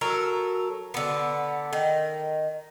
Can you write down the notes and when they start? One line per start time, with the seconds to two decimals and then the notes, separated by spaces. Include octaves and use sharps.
0.01 F#3 A4 A#4
0.94 D3 B3
1.73 D#3